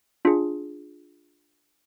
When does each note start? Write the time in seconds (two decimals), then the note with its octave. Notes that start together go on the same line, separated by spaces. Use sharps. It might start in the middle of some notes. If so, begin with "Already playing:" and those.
0.25 D4 F4 G#4